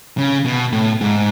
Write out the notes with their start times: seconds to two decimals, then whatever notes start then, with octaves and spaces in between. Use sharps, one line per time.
0.18 C#3
0.46 B2
0.72 A2
1.01 G#2